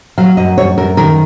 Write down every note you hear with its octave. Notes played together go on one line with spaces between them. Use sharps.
F#3 F5
F#2 D#5
F#2 C#5
F#2 A#4
D#3 A#4